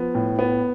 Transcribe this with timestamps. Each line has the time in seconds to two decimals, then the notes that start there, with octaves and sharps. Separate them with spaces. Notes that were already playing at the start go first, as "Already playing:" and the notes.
Already playing: F3 B3
0.15 A2
0.39 B3